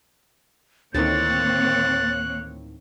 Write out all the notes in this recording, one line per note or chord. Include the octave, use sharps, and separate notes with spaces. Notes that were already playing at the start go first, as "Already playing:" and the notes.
D2 A2 D#3 A#3 C4 C#5 F#6 A6